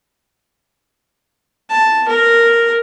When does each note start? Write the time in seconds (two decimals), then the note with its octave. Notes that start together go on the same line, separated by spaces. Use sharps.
1.69 A5
2.08 A#4